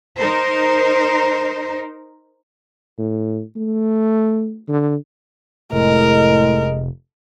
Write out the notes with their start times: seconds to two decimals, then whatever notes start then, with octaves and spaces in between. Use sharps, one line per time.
0.19 D#4 A#4 C5
2.98 A2
3.56 A3
4.68 D3
5.72 F1 A2 G#3 A#4 D#5